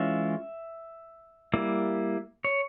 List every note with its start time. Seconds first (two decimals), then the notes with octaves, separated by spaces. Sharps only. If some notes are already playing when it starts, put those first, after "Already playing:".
Already playing: E3 G#3 C#4 F4 E5
1.54 G3 A#3 E4
2.45 C#5